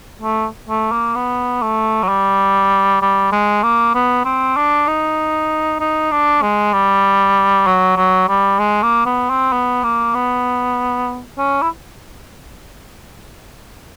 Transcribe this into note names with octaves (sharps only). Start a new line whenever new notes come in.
A3
A3
A#3
B3
A3
F#3
G3
G3
G#3
A#3
B3
C4
D4
D#4
D#4
D4
G#3
G3
F#3
F#3
G3
G#3
A#3
B3
C4
B3
A#3
B3
C#4
E4